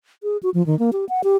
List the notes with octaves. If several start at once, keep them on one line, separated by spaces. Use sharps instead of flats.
G#4
F#4
F3
D#3
A#3
G4
F#5
G4